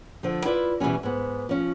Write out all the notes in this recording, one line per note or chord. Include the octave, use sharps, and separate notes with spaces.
D3 F3
E4 F4 B4 D5
B2 E3 G3 G#3 C#4
G#2 B3
F3 C#4